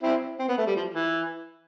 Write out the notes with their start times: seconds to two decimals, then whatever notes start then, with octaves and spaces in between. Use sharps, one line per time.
0.03 C4 E4
0.39 C4
0.49 B3
0.58 A3
0.67 G3
0.76 F3
0.94 E3